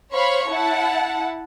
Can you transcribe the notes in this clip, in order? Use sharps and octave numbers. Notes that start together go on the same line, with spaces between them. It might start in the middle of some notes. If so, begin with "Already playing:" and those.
C5 C#5 F5 B5 C#6
E4 F#5 A5